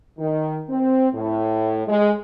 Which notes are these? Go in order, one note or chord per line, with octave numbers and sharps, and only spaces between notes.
D#3
C4
A2
G#3